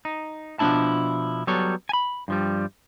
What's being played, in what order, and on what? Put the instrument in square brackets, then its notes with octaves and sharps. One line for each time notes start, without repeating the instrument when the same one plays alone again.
[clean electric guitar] D#4
B2 F3 C4 D4 E4 A5
F#3 G3 B3 A4 C#5
G#5 B5
G2 F3 G3